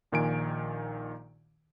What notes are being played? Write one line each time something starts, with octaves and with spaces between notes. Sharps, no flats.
A#1 A#2 D#3 G#5 D7